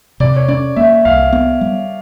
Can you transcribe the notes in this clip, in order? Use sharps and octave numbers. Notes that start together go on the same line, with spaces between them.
C3 D5
C#5
C#4 D5
A#3 E5
C2 F5
B3
G3